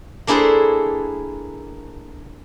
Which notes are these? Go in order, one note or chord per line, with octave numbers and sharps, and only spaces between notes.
A#3 D4 E4 G#4 A4 C5